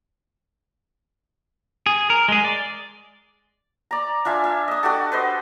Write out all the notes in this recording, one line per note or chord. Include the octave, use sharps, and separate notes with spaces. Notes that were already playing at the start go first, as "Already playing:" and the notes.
G#4
A#4
G#3 G#4
D5
D5 A#5
D4 F4 E5 G#5
E5
D#5 D#6
D4 F#4 G4 A4
B4 C5 D#5